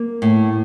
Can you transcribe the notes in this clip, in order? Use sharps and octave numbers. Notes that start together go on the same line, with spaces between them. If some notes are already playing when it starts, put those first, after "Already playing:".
Already playing: A#3
A2